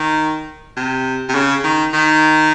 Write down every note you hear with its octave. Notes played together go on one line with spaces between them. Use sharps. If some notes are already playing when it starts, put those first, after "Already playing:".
Already playing: D#3
C3
C3
C#3
D#3
D#3